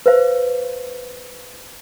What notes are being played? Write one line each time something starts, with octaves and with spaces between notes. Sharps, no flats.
B4 C5 F5